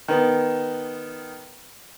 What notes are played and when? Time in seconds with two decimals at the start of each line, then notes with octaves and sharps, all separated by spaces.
0.08 D#3 B3